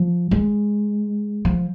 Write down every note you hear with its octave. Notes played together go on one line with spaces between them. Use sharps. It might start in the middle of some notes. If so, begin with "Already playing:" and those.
Already playing: F3
G#3
F3